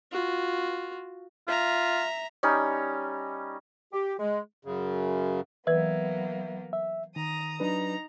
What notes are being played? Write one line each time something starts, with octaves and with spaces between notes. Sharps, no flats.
F4 F#4
F4 E5 A#5
G3 C#4 D#4
G4
G#3
F#2 C#3
E3 F#3 A#3 B3 B4 E5 G#6
E5
D#3 A#5 D#6
F#3 D4 D#4 B4 A#5